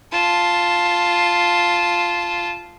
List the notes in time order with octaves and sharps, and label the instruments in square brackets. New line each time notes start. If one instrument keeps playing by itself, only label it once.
[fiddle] F4 A5